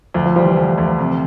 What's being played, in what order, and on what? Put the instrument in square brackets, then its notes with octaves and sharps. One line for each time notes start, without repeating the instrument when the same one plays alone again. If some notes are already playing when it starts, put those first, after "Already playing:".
[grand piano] D2 [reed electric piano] F3
[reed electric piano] F3
[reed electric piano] F3 [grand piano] G3
[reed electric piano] E3
[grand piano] D2
D2
C3